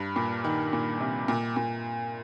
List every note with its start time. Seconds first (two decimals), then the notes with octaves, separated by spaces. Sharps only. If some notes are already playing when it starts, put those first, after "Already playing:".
Already playing: G2
0.16 A#2
0.44 D#3
0.73 A#2
1.01 C3
1.28 A#2
1.57 A#2